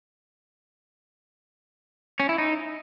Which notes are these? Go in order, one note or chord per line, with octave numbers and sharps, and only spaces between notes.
C#4
E4
D#4